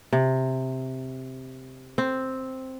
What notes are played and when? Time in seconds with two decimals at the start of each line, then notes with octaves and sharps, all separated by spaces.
0.13 C3
1.98 C4